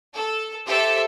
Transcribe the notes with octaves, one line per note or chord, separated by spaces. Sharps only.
A4
G4 A4 C5 E5